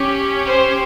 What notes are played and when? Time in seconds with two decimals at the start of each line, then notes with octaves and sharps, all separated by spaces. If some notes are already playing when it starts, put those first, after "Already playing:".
Already playing: C#4 G4
0.47 C5